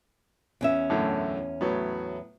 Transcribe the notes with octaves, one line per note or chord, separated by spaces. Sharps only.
E2 C#4 E5
F#2 A2 D3
A2 F#3 B3